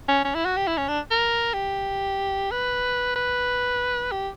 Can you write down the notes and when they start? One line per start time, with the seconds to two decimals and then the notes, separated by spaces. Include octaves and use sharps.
0.08 C#4
0.25 C#4
0.35 E4
0.46 F#4
0.57 G4
0.67 E4
0.78 C#4
0.88 D4
1.11 A#4
1.54 G4
2.51 B4
3.16 B4
4.12 G4